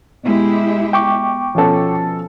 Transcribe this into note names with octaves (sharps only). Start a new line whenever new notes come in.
B2 G#3 E4 G4
G5 C#6 D6
B2 F3 C#4 A4